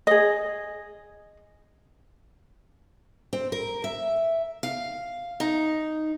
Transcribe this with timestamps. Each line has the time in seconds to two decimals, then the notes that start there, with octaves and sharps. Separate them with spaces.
0.07 G#4 D#5
3.33 C4
3.52 A#4
3.84 E5
4.63 F5
5.40 D#4